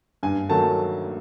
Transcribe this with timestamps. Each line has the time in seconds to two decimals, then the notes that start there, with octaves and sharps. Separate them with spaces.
0.23 G2 G#5
0.49 D#3 F#3 A3 A5